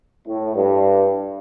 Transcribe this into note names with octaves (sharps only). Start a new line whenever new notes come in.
A2
G2